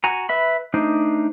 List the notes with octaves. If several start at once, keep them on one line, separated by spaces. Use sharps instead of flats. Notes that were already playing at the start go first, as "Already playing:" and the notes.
F#4 G#5 A#5
B4 E5 B5
A3 D4 D#4 C5